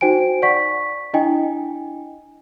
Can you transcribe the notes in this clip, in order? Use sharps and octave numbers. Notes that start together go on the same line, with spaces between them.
D#4 F#4 C5 G5 G#5 D7
D5 F#5 C#6 B6
D4 E4 D#5 G5 G#5